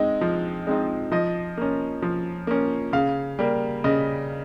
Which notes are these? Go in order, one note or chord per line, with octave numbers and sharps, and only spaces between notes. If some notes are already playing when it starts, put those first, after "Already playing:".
Already playing: G#3 C4 D#4
F3
G#3 C4 D#4
F3 D#5
A#3 C#4
F3
A#3 C#4
C#3 F5
G3 A#3
C#3 D#5